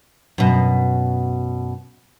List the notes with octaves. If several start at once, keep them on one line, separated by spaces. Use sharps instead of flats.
F#2 B2